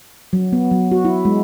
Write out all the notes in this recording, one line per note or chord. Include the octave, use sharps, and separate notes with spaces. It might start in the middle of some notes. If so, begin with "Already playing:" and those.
F#3
B3
F#3
F#4
E4
G#3